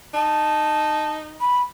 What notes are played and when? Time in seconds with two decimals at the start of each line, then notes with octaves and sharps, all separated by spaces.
0.14 D#4 A5
1.40 B5